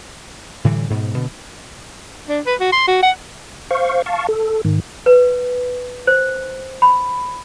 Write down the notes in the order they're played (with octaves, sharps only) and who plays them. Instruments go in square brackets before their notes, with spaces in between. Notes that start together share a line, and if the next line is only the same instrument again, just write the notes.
[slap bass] A2 D3 E3 G3
G#2 B2
B2 D3
[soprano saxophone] D4
B4
F#4
C6
F#4
F#5
[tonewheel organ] C5 F5 C#6
F5 A5 C#6
A4
G#2 D#3
[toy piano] B4
C5
B5